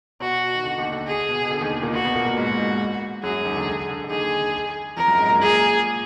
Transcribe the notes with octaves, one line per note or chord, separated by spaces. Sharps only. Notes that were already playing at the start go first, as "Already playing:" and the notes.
B2 F#4
D#3
D3
D#2 D#3
D3
G#4
B2
B2
D3
D#2 D#3
A#2 A#3
B2 B3 F#4
B2 B3
A#2 A#3
A#2 A#3
G#2 G#3 F#4
G#2 G#3
F#2 F#3 G#4
D#2 D#3
D3
D3
D3
D3
D#2 D#3 G#4
F2 F3 A#4
F#2 F#3
G#2 G#3
A#2 A#3
A#2 A#3 G#4